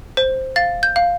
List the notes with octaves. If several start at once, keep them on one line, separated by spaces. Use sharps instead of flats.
C5
F5 A6
G6
F5